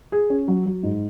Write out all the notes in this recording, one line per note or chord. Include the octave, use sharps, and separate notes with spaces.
G#4
C#4
F#3
F#3
G#2